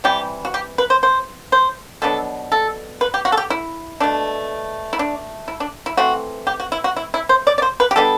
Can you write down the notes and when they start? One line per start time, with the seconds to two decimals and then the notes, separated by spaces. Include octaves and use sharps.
0.04 C3 E3 G3 G4
0.45 F#4
0.54 G4
0.78 B4
0.90 C5
1.03 C5
1.52 C5
2.02 B2 F#3 B3 D4 A4
2.52 A4
3.01 B4
3.14 G4
3.25 F#4
3.32 A4
3.37 G4
3.50 E4
4.00 B2 A3 D4
4.93 E4
4.99 D4
5.48 E4
5.60 D4
5.86 E4
5.97 E3 A3 C4 F#4
6.47 G4
6.60 F#4
6.72 E4
6.84 F#4
6.96 E4
7.14 E4
7.29 C5
7.47 D5
7.58 D5
7.62 C5
7.80 B4
7.91 G4
7.95 B2 G3 B3 D4 A4